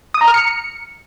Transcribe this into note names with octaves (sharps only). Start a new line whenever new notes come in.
D#6
A#5
F6
C#7